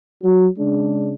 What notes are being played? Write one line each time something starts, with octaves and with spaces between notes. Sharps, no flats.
F#3
C#3 G#3 D4